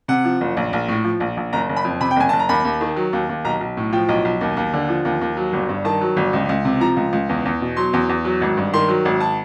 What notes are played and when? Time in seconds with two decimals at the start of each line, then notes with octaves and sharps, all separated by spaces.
0.08 C3 F#5
0.25 F3
0.41 F#1
0.57 A#1
0.73 A#1
0.88 A2
1.05 F3
1.20 A#1
1.37 A#1
1.53 F#1 A#5
1.69 F#1
1.76 B5
1.84 F2
2.00 C3 B5
2.11 G5
2.16 F#1 G#5
2.29 F#1 A5
2.39 A#5
2.49 D#2 B5
2.65 D#2
2.81 D#3
2.96 F#3
3.13 D#2
3.29 D#2
3.45 B1 A#5
3.61 B1
3.77 A2
3.93 F3 G5
4.09 B1
4.25 B1
4.41 D#2
4.57 D#2
4.73 D3
4.89 F3
5.05 D#2
5.21 D#2
5.37 F#3
5.53 G1
5.69 G2
5.85 D#3 A5
6.01 F#3
6.17 G1
6.33 C#2
6.49 C#2
6.65 C3
6.80 F3 A#5
6.97 C#2
7.13 C#2
7.29 E2
7.45 E2
7.61 B2
7.77 F#3 C6
7.93 E2
8.09 E2
8.25 F#3
8.42 G#1
8.57 G2
8.73 D#3 C6
8.89 F#3
9.05 G#1
9.20 A5